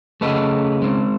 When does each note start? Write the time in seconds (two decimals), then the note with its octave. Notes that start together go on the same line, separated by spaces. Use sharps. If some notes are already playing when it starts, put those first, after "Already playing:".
0.21 C#3 A3 B4 D#5
0.82 G#3 C4